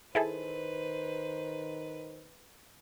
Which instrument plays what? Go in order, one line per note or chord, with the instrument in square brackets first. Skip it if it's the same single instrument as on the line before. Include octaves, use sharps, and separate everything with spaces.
[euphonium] D#3 [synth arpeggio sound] E4 G#4 A4 [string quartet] B4 [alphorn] C5